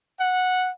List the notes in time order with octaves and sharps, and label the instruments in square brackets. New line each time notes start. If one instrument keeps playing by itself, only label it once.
[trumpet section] F#5